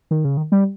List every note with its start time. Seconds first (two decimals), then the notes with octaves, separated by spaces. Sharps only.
0.11 D#3
0.25 C#3
0.37 D#3
0.52 G3